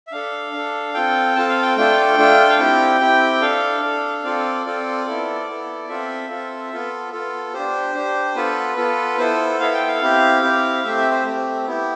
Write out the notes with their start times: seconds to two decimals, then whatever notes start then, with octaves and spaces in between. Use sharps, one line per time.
0.07 E5
0.12 D4 A4 F5
0.53 D4 A4
0.94 C4 F4 A4 G5
1.35 C4 F4 A4 A5
1.49 F5
1.62 G5
1.77 A3 D4 F4 A4 G5
2.18 A3 D4 F4 A4
2.50 F5
2.59 C4 E4 G4 G5
3.01 C4 E4 G4
3.41 D4 A4 F5
3.82 D4 A4
4.24 C4 F4 A4 D5
4.66 C4 F4 A4 D5
5.06 B3 E4 A4
5.47 B3 E4 A4
5.89 C4 F4 A4 E5
6.30 C4 F4 A4
6.71 B3 F4 A4
7.12 B3 F4 A4
7.54 D4 G4 C5
7.95 D4 G4
8.35 B3 F4 A4 B4
8.77 B3 F4 A4
9.18 B3 E4 A4 C5
9.59 B3 E4 A4 F5
9.74 G5
9.88 F5
10.01 C4 E4 G4
10.42 C4 E4 G4
10.83 A3 C4 G4 E5
10.97 E5
11.11 C5
11.25 A3 C4 G4
11.66 B3 E4 G4